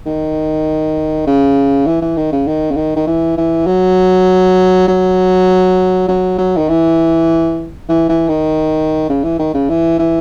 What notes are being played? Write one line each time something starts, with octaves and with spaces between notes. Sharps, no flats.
D#3
C#3
E3
E3
D#3
C#3
D#3
C#3
D#3
D#3
E3
E3
F#3
F#3
F#3
F#3
D#3
E3
E3
E3
D#3
C#3
E3
D#3
C#3
E3
E3